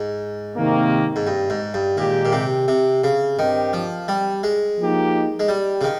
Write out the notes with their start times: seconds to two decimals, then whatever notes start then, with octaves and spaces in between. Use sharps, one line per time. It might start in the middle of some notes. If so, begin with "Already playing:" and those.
Already playing: G#2
0.57 C3 D#3 A#3
1.16 G#2
1.27 G2
1.50 G#2
1.74 G2
1.97 A#2 D#3 G#3 D#4 G4
2.25 A#2
2.32 C3
2.68 C3
3.04 C#3
3.38 G2 D#3 G3 C4 G4
3.73 F3
4.08 G3
4.43 G#3
4.79 F3 A#3 D#4 G4
5.40 G#3
5.48 G3
5.81 C#3
5.84 D#3